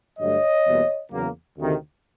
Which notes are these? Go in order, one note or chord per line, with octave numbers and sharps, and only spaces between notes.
G2 D3 F#3 A3 C#5 D#5
E2 B2 G3 A#3
E2 C#3 F#3 A#3
D2 C3 D#3